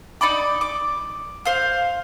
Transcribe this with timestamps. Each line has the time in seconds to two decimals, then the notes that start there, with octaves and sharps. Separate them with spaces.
0.21 D#4 D5 B5 D6
0.61 D6
1.45 C5 F5